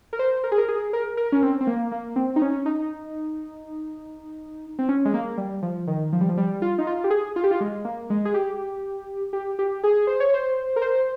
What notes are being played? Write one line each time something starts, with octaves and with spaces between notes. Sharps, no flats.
A#4
C5
A#4
G#4
A#4
G#4
A#4
A#4
C#4
C4
C4
A#3
A#3
C4
D#4
C#4
D#4
C4
C#4
G#3
A#3
G3
F3
D#3
F3
G3
F3
G3
F4
D#4
F4
G4
G#4
F4
G4
F4
G#3
A#3
G#3
G#4
G4
G4
G4
G#4
C5
C#5
C5
A#4
C5